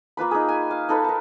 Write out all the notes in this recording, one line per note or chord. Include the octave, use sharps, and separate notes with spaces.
A#3 F4 B4 B5
D#4 G#4
G#5
F5
D#4 A4 B4 B5
A#4 A5